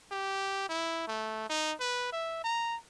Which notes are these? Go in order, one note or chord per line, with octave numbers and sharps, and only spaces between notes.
G4
E4
A3
D#4
B4
E5
A#5